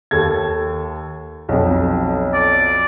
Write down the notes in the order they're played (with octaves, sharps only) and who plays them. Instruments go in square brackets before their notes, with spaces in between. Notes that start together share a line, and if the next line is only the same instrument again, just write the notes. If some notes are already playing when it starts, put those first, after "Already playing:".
[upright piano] D#2 A4 G#6
B1 F2
[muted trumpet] D5